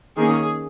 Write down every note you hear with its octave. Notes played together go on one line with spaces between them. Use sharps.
D#3 A#3 C#4 G#4